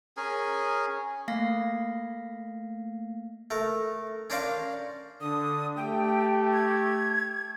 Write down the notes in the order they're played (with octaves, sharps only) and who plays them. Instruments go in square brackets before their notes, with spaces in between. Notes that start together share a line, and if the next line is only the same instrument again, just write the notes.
[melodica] C#4 G#4 A#4 G#5
[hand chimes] A3 A#3 F5 A#6 C7
[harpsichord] A3 A#4
C#4 D4 A#4 C5 D5 F5
[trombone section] D3 [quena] D#6
[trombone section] A3 G4 [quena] G5
[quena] G#6